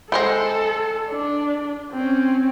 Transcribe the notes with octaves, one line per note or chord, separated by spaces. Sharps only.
G#3 A4 C5 G5
D4
C4 C#4